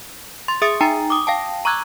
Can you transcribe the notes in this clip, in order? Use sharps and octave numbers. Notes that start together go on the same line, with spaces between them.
C6 A6
G#4 E5 D#6 A6 C#7
D#4 G5 A#5 A6 C#7
D6 D#6
F5 G5 A5
A#5 C#6 D6 E6 F#6 G#6